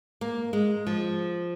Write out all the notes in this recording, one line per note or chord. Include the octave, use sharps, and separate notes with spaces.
A#3
G#3
F3